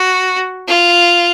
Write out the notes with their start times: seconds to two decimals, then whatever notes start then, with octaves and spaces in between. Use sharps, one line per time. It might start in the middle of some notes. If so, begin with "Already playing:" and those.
Already playing: F#4
0.67 F4